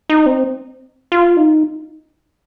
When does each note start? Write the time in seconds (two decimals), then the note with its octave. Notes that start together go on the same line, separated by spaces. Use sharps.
0.10 D#4
0.26 C4
1.12 F4
1.37 D#4